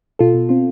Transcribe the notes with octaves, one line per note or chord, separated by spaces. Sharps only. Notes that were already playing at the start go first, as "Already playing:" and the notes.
B2 F4 A4
B2
C4 F4